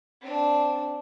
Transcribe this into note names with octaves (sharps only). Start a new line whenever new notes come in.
C4 D4